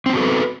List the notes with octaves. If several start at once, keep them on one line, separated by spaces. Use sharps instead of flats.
B3 C4 F#4 A4 B4